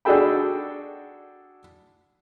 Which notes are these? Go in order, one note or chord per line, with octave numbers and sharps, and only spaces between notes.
D4 F#4 G#4 A4 G5 B5